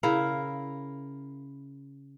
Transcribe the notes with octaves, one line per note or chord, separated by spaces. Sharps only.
C#3 E4 A#4 F5